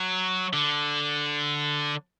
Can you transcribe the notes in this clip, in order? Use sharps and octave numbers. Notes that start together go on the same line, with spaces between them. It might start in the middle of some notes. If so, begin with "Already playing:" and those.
Already playing: F#3
D3